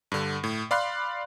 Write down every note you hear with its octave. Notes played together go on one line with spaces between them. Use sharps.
G2 D3
A2
D5 F5 B5 C6 F#6 C7